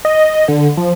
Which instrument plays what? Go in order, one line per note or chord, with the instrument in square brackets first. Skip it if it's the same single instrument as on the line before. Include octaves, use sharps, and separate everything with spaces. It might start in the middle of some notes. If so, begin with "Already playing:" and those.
[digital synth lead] D#5
D3
F3